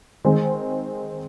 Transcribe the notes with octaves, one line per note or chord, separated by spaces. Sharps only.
D#3 G#3 C4 G#4